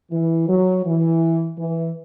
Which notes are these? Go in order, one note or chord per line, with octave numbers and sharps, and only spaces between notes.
E3
F#3
E3
E3